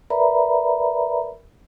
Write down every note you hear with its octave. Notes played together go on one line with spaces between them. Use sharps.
A#4 B4 D5 E5 A#5 B5